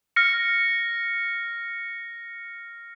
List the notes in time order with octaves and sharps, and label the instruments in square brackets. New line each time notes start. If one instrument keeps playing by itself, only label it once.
[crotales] F6 A#6 C#7